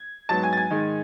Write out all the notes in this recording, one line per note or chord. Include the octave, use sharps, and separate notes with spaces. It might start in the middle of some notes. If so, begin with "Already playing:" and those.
Already playing: G#6
G#2 F#3 B3 A5 A6
G#5 G#6
A6
G#5 G#6
G#2 D#3 G#3